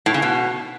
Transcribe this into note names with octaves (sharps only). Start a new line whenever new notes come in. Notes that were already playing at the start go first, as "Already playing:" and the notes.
A2
C#3
B2